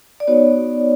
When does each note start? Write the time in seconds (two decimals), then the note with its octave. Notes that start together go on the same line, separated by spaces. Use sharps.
0.20 D5
0.27 B3 D#4 F#4 C#5